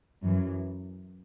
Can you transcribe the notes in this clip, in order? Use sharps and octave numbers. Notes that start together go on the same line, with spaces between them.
F#2 E3